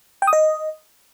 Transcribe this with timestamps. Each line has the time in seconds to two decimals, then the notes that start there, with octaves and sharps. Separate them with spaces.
0.22 G5
0.27 D#6
0.33 D#5